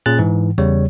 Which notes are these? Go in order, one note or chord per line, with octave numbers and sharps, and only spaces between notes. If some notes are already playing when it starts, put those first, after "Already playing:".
A#2 C#4 G#4 F#6 A6
G#2 E3
E2 C#3 G3 C#5